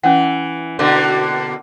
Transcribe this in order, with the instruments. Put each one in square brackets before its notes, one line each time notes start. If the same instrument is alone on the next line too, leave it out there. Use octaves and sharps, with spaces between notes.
[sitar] E3 [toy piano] C#4 F#5
[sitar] B2 D3 A#3